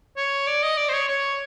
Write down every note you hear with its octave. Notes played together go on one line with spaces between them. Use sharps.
C#5
D5
D#5
D5
C5
C#5
C#5